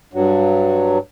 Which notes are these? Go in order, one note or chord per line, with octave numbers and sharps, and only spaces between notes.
G2 F#3